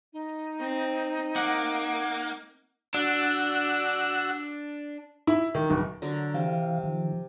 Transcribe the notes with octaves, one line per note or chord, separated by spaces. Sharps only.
D#4
C4
A#3 F#5 D6
D4 F#4 E6
E4
D#3
D1
D3 F#3 A#4
C3 E3 F5
D#3 F3